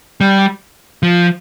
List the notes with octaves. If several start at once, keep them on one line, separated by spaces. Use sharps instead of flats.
G3
F3